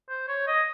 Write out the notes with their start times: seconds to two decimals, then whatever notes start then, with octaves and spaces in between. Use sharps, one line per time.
0.09 C5
0.28 C#5
0.47 D#5